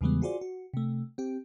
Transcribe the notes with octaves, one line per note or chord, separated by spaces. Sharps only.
E2 C#3 E3 G3 G#3 B3
F4 F#4 G#4 C5 D5
F#4
C3 A3
C4 G4